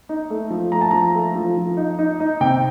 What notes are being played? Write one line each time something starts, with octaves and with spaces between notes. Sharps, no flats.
D#4
A3
F3
A3 A#5
A5
F3 A#5
A3
F3
F3
D#4
D#4
D#4
C3 G5